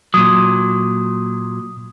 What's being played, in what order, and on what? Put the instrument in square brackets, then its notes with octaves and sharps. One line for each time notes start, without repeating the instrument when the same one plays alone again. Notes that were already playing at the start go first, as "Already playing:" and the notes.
[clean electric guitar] A#2 F#3 [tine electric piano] D#6